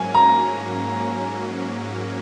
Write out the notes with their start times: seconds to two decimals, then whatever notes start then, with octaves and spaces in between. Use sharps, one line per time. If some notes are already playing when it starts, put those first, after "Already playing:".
Already playing: G#2 F#3 A#3 C#4 G#5
0.15 A#5